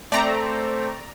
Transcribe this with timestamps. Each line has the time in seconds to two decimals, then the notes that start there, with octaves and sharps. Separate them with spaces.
0.12 A3 C4 D5 A#5